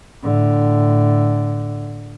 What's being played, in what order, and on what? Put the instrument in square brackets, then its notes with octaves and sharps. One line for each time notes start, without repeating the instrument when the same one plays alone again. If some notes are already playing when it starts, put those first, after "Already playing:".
[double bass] A2 D3